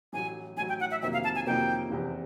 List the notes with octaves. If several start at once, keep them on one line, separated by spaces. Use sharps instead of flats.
A1 A2 F#3 G#5
A1 A2 F#3 G#5
G5
F#5
E5
F2 C3 D#3 F#3 A#3 E5
F5
A5
G#5
F2 C3 D#3 F#3 A#3 G5
F1 E2 C3